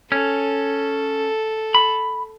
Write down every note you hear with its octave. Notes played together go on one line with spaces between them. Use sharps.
C#4 A4
B5